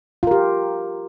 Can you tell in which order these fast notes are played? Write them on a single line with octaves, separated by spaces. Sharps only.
F4 A#4 G4